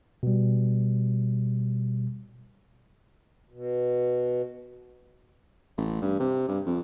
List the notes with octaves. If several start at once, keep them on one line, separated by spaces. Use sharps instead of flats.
B2 G3
B2
A1
G2
C3
G2
F2